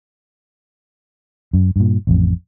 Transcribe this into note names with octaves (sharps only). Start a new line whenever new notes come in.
F#2
G2 A#2
A1 F2